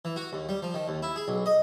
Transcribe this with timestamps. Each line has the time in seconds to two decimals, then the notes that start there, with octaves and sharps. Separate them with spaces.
0.05 E3
0.16 F#4
0.33 D#2
0.49 G3
0.62 F3
0.74 D#3
0.88 D#2
1.02 E4
1.16 G#4
1.28 B1
1.46 D#5